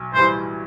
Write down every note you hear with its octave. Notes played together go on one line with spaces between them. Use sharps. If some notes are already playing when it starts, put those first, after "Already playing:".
Already playing: B1
A2 E3 G3 C5